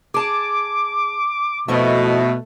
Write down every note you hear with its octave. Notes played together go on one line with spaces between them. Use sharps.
G#4 A5 D6
F2 B2 A3 E4 D#5